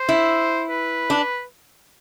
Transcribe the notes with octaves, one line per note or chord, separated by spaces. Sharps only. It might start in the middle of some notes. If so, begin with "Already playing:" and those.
Already playing: C5
E4
B4
D4